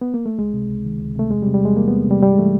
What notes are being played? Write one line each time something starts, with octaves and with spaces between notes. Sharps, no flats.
B3
A#3
A3
C#2 G#3
C3
C#2
D#3
C#2
C3 A3
E2 G#3
G3
C3
G3
E2 G#3
E3 A#3
E2 B3
C3 G3
G2 G3
G#3
E3 A3